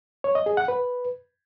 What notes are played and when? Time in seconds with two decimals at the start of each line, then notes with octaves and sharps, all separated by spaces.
0.24 C#5
0.35 D#5
0.46 G#4
0.57 F#5
0.68 B4